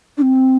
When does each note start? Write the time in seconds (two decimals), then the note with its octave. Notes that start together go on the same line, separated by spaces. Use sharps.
0.18 D4
0.22 C4